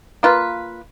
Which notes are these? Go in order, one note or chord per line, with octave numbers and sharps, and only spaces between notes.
A#3 F4 B4